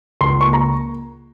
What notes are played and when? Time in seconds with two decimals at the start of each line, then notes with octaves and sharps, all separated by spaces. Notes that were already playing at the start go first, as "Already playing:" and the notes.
0.21 C#2 C6
0.41 A#3 C#6
0.53 A#5